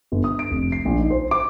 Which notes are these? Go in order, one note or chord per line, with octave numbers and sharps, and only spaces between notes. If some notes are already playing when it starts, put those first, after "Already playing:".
G1
D#6
D7
F1
C7
A#1
D#4
C5
D6